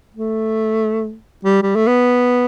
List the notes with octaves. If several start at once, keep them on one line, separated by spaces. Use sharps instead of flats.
A3
G3
G3
A3
B3